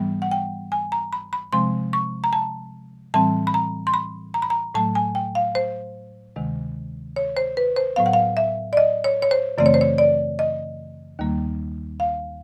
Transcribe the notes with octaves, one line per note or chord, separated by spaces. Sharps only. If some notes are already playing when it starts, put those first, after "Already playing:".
Already playing: G#2 E3 G3 B3
F#5
G5
G#5
A#5
B5
B5
C3 F3 G#3 C4 C6
C#6
A#5
A5
A2 E3 G3 C4 A5
B5
A#5
C6
B5
A#5
B5
A#5
A2 F#3 A3 A5
G#5
G5
F5
C5
D2 C3 D#3 G#3
C#5
C5
B4
C5
A2 F#3 B3 F5
F#5
F5
E5
D5
D#5
C#5
C#5
C5
F#2 C#3 E3 A3 C4 D5
C#5
C5
C#5
D5
D#5
D#2 D#3 G3 A#3
F5